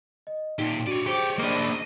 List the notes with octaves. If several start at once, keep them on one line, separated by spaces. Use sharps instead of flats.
D#5
A#2 D#4 G4
D4 F#4 C#5 D5 D#7
G4 G#4 C5
A#3 D4 D#5 F5